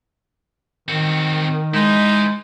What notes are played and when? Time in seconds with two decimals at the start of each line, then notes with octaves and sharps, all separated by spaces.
0.88 D#3 C4 F#4
1.74 G#3 D#4 E4 B4